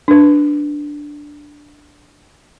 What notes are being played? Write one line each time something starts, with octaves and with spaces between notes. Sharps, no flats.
D4 B4